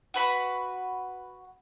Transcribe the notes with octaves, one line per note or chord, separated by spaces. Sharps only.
F#4 B4 B5